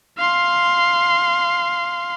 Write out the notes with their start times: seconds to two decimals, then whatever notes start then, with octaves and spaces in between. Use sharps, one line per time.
0.17 F5 C6